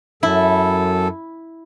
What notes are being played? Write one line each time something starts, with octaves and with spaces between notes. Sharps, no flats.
F#2 E4 A4